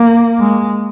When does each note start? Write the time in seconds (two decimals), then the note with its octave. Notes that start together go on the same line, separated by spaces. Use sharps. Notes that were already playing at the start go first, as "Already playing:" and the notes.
Already playing: A#3
0.39 G#3